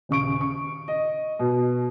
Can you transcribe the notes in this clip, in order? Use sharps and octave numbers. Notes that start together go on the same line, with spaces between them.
D#1 C#3 C#6 D7
C#6
D#5
B2